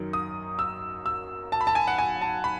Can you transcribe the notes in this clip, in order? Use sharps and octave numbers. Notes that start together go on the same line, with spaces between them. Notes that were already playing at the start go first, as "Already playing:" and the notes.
Already playing: F#2 D#3 F#3
D#6
E6
E6
A5
B5
A5
G#5
F#5
G#5
A5
B5